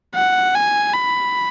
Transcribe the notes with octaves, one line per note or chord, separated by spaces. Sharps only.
F#5
G#5
B5